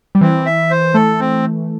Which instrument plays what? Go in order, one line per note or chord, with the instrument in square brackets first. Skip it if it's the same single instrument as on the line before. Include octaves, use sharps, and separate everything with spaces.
[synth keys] G3
[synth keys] E3 [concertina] C4
[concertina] E5
C5
[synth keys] A3 [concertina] A4
[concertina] C4